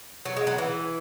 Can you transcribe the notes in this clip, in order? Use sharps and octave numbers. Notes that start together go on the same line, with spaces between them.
F#3
G#3
F#3
E3